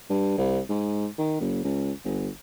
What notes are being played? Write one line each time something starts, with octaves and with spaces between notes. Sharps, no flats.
G2
C2
G#2
D#3
F#1
C#2
G1